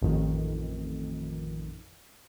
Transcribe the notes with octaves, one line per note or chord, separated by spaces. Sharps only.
A1 F2 D#3